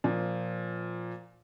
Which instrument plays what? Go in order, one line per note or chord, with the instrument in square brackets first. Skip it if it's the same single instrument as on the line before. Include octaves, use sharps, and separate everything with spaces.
[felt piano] A#2 F3